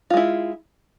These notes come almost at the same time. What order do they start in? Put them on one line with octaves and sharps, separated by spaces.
F4 G#3 E4